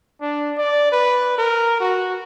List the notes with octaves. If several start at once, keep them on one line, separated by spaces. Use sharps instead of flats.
D4
D5
B4
A#4
F#4